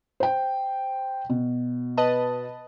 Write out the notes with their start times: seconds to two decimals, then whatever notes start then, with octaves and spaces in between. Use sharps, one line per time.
0.20 C5 G5
1.30 B2
1.97 B4 D#5 A5